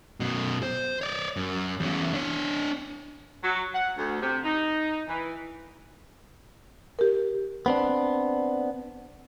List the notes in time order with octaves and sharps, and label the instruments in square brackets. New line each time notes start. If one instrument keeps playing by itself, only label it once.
[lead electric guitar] F#2 B2
C5
C#5 D5
F#2
E2 C#4
D4 C#5
[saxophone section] F#3
F#5
D2
C3
D#4
E3
[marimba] G4 A#4
[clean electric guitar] B3 C4 D4